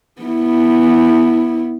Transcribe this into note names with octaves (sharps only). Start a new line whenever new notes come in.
B3 E4